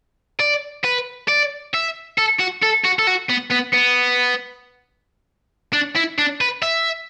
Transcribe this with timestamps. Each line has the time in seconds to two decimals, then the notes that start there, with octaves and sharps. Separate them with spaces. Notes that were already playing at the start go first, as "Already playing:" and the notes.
0.40 D5
0.84 B4
1.28 D5
1.74 E5
2.18 A4
2.40 F#4
2.63 A4
2.85 F#4
2.99 A4
3.07 F#4
3.30 B3
3.51 B3
3.74 B3
5.73 D4
5.96 E4
6.18 D4
6.41 B4
6.63 E5